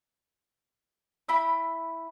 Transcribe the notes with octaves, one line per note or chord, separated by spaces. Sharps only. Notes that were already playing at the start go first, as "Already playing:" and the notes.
E4 G5 B5 E6